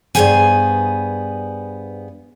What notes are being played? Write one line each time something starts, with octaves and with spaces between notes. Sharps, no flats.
G2 B3 G#4 C5 G5 G#5